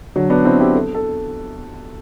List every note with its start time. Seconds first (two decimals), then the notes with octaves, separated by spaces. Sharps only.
0.16 D3 F#3
0.30 B3 D4
0.45 C4 E4
0.59 E4 G4
0.74 A4
0.95 A4